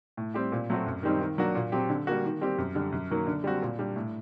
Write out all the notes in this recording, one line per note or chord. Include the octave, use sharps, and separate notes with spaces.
A2
G3 C4 G4
A#2
F#3 A3 C4 F#4
F#2
D#3 G3 C4 D#4
D#3
F#3 A#3 D4 F#4
A#2
F#3 C4 G4
D3
G3 A#3 F#4
D#3
G3 C4 G4
F#2
D3 G3
F#2
D#3 F#3 A#3
D3
G3 C4 F#4
A#2
G3 D4
A2